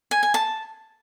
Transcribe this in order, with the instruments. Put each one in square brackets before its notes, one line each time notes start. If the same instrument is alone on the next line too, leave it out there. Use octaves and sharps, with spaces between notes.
[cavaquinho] G#5
G#5
A5